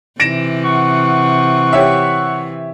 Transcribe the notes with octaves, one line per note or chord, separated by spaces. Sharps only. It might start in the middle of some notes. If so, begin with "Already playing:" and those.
C3 E3 A#6 D7 E7
F#5 C#6
G4 C#5 E5